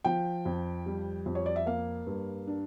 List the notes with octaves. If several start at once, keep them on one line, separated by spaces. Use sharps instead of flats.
F3 G5
F2
G3
F2
C#5
D5
E5
A#3 F5
G2
D4